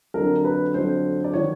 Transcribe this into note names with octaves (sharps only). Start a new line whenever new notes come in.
F2 D3 F#3 A#4
B4
F2 D3 F#3 C5
D5
D#3 F#3 C#5